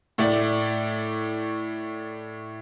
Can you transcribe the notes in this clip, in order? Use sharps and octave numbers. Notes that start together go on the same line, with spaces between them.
A2 A3 D5